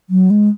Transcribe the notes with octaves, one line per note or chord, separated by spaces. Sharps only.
F#3
G#3